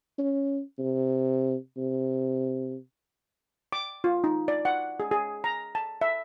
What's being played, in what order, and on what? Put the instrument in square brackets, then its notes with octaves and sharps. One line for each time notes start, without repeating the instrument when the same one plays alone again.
[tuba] C#4
C3
C3
[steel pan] D6
F4
D#4
D5
F#5
G#4
G#4
A#5
A5
E5